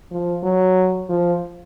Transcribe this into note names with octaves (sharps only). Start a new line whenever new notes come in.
F3
F#3
F3